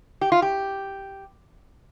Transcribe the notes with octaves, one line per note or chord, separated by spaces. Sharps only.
G4
F4
G4